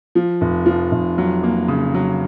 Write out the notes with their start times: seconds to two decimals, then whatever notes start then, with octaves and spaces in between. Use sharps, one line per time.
0.15 F3
0.41 F1
0.66 F3
0.91 F1
1.18 F#3
1.43 A#3
1.68 C#3
1.94 F#3